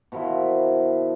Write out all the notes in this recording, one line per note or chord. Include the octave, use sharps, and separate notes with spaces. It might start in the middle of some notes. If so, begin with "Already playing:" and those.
B2 D#3 F3 E4